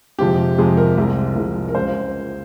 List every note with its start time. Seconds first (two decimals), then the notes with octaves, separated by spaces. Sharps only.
0.19 F2 C3 F3 G#3 G4
0.58 F2 C3 F3 G#3 G#4
0.77 A#4
0.97 C2 C3 F3 G#3
1.36 C2 C3 F3 G#3
1.69 A#4
1.75 C#2 C#3 G#3 C5